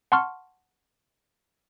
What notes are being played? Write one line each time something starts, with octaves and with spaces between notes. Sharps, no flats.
F#5 A5 C6 C#6 F6